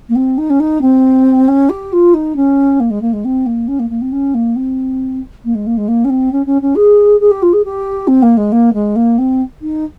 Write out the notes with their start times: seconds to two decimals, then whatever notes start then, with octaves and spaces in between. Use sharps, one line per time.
0.09 A#3
0.15 C4
0.38 D#4
0.50 C#4
0.60 D#4
0.81 C4
1.48 C#4
1.69 G4
1.93 F4
2.14 D#4
2.36 C#4
2.80 A#3
2.90 G#3
3.01 A#3
3.13 G#3
3.25 C4
3.46 A#3
3.68 C#4
3.79 A#3
3.90 A#3
4.01 C4
4.12 C#4
4.34 A#3
4.56 C4
5.45 A#3
5.55 G#3
5.67 A#3
5.77 G#3
5.88 A#3
6.04 C#4
6.10 C4
6.32 C#4
6.46 C#4
6.62 C#4
6.75 G#4
7.20 G#4
7.31 G4
7.42 F4
7.53 G#4
7.64 G4
8.07 C4
8.22 A#3
8.37 G#3
8.52 A#3
8.73 G#3
8.96 A#3
9.18 C4
9.62 D#4